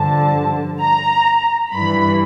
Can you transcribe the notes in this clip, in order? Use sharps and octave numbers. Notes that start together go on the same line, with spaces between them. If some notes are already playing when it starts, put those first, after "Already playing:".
Already playing: G2 D3 F3 A5
A#5
G2 E3 B5